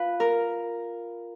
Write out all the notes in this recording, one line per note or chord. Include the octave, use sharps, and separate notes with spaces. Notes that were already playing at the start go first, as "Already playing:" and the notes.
Already playing: F4 B4
A#4